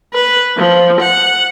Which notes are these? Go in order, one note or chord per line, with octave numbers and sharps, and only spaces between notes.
B4
F3
F#5